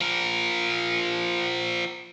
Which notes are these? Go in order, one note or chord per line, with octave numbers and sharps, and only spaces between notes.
F3 A#4